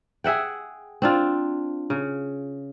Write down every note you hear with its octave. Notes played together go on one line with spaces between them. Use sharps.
G#4 E5 F#5 G5
C4 D4 F4
C#3